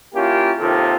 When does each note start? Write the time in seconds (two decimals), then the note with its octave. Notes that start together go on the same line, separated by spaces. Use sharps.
0.15 A#3 C#4 E4 F4 G4
0.59 D#2 C3 D#3 F4 A4